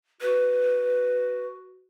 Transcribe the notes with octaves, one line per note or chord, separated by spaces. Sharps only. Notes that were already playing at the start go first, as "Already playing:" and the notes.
F#4 B4